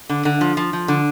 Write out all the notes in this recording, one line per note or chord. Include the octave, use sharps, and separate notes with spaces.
D3
D3
F3
F3
F3
D3